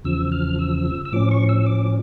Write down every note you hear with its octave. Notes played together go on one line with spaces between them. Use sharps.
E2 C#3 F3 E6
F6
E6
E6
A2 F3 C#4 D6
C#6
E6
D6